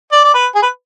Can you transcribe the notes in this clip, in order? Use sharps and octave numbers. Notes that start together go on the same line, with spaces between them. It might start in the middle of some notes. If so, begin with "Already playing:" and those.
D5
D5
B4
G#4
B4